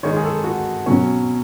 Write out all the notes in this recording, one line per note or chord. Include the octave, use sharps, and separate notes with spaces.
D#3 G#3 D#4 C#5
G#4
A4
F#4
B2 F#3 C#4